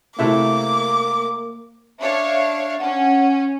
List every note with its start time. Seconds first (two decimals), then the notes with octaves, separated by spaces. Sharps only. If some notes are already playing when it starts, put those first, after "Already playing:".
0.19 C3 A3 A#3 E4 D6
2.00 D4 C#5 E5 F5
2.80 C#4 F#5